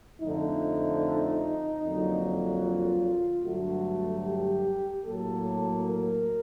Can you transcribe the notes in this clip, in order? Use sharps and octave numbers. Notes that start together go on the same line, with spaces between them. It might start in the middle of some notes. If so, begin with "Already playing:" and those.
F2 D3 F3 A3 D#4
F2 D3 F#3 A#3
F4
G2 D3 F#3 A3 F#4
G4
A2 F#3 A#3 A4
A#4